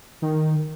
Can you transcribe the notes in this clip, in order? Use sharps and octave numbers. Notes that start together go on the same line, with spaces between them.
D#3